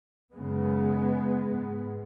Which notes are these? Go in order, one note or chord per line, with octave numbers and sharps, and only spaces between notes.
F#2 C#3 G#3 B3
G#2